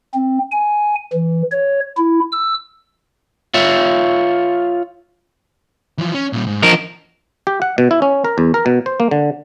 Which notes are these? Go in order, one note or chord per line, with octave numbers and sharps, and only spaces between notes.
C4
G#5
E3
C#5
E4
E6
F4 C#5 E5
E3 F3
C#4
A#2 G3
G#2
F3 A#4 D#5
G4
F#5
B2
E4
C#4
A#4
E2
A#4
B2
C5
A#3
D3